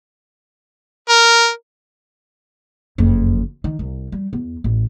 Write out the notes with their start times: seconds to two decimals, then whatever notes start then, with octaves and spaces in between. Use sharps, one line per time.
1.09 A#4
2.98 F#1 F2
3.64 D#3
3.79 C2
4.12 G3
4.33 E2
4.64 A1